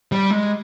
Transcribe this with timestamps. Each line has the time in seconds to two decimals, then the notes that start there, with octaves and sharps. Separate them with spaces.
0.12 G3
0.31 G#3